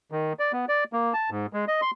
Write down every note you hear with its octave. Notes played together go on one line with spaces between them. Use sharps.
D#3
D5
B3
D5
A#3
A5
G#2
G#3
D#5
C6